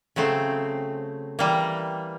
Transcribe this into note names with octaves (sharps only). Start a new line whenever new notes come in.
C#3 F#3 A3 C4
E3 G3 A#3